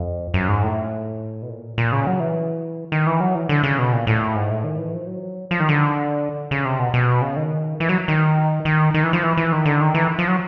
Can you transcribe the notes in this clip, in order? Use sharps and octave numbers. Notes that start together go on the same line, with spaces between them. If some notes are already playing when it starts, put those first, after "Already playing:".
Already playing: F2
F#2
G#2
A2
B2
A#2
A#2
C#3
F#3
E3
D#3
E3
F#3
E3
D3
C#3
B2
A#2
A2
G#2
A2
D#3
E3
F3
F#3
F3
D#3
D3
C#3
C3
B2
B2
C#3
D#3
E3
F#3
D#3
D#3
D#3
E3
F3
E3
E3
D#3
D3
D#3
E3
F3
F#3